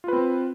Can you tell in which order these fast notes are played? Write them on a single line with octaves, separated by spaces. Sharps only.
F4 B4 C4